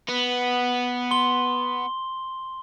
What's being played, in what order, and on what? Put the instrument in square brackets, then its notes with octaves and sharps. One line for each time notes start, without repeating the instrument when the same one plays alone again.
[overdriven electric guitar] B3
[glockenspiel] C6 G7